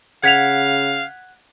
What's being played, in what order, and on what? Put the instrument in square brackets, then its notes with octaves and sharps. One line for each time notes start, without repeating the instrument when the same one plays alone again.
[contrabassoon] C#3 [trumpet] F5 [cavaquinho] F#5 [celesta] G#6 B6 F7